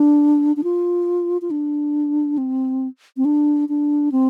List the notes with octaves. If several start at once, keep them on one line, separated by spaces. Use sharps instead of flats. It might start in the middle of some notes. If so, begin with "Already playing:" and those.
Already playing: D4
D4
F4
F4
D4
C4
C4
D4
D4
C4